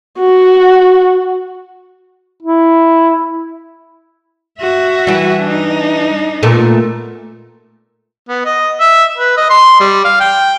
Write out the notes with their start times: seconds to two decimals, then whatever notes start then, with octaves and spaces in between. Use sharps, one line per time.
0.19 F#4
2.42 E4
4.59 F#4 E5
5.07 E3 G3
5.43 D4 D#4
6.43 A#2 A3 B3
8.29 B3
8.45 D#5
8.80 E5
9.18 B4
9.37 D#5
9.50 C6
9.80 G3
10.05 F5
10.21 G5